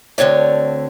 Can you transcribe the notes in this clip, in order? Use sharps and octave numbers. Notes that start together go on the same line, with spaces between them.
D2 D3 C4 C#5 D5